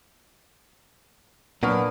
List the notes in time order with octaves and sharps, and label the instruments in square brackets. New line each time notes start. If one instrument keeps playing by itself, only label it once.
[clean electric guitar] A#2 A#3 D4 [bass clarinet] F#3 [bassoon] B3 [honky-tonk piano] B5 C#6 F6